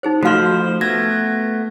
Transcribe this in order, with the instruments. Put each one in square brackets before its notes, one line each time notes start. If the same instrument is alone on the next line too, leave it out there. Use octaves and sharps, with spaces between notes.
[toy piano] D#4 G#4 C5
[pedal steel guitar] F3 C5 [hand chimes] A3 F6 [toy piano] F#4 F5 C6
[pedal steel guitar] A3 B3 [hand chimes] G#6 A#6